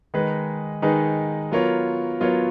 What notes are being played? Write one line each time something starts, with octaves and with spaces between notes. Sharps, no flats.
D#3 G#3 D#4 G#4 B4
D#3 G#3 D#4 G#4 B4
F#3 B3 F4 A#4 C#5
F#3 B3 F4 A#4 C#5